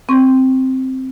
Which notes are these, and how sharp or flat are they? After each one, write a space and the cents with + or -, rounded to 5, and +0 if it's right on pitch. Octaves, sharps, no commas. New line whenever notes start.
C4 +0 C#6 +5